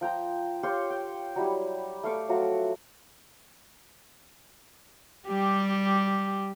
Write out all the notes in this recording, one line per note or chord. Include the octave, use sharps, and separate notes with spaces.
F3 G5 A#5
F4 G4 C#5 C6
G5
F#3 G3 E4 G4
A3 F5 C#6 D6
F3 F#3 A3 F#4
G3 G4